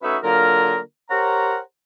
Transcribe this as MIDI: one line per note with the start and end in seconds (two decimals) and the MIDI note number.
0.03 0.17 57
0.03 0.17 61
0.03 0.17 63
0.03 0.17 66
0.03 0.17 71
0.03 0.17 76
0.23 0.78 50
0.23 0.78 54
0.23 0.78 58
0.23 0.78 65
0.23 0.78 70
1.10 1.58 67
1.10 1.58 70
1.10 1.58 72
1.10 1.58 73
1.10 1.58 78
1.10 1.58 82